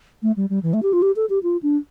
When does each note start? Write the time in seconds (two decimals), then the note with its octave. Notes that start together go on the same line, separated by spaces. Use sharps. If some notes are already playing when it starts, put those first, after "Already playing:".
0.22 A3
0.36 G3
0.50 G3
0.63 E3
0.73 A3
0.83 G4
0.93 F4
1.02 G4
1.16 A4
1.30 G4
1.43 F4
1.63 D4